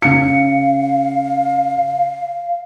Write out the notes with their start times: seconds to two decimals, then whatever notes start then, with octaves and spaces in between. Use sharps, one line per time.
0.02 C#3 F5 C#7